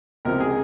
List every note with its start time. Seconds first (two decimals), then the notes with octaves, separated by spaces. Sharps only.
0.25 C#2 C3 F3 A#4
0.40 G#4